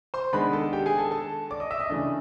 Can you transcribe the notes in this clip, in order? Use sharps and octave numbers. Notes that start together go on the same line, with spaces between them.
C5 C6
D#3 G#3 B3 D4 B4 B5
A4 A5
G4 G5
G#4 G#5
A4 A5
A4 A5
D5 D6
D#5 D#6
E5 E6
D#5 D#6
C#3 E3 A3 D4